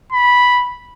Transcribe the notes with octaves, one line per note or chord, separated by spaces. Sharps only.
B5